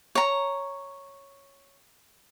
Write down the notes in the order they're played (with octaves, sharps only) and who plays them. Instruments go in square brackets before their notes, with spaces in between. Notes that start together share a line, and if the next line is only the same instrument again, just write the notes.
[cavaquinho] C#5 A#5